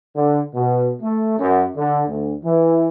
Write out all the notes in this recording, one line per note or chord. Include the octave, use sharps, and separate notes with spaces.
D3
B2
A3
F#2
D3
D2
E3